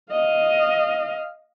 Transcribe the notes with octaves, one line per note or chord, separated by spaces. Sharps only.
D#5 F5